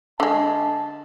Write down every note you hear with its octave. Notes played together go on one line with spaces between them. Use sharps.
D3 G#3 A5